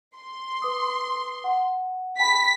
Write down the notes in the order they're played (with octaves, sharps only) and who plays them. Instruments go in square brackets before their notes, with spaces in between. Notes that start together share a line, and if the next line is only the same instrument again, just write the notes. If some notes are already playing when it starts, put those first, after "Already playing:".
[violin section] C6
[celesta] B4 D6 D#6
F#5
[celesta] G5 A5 B5 [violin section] B6